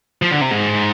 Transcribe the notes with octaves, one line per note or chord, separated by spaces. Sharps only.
F3
D3
C3
G#2